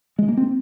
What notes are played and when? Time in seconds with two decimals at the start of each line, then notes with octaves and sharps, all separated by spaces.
0.19 G#3
0.28 A#3
0.37 C4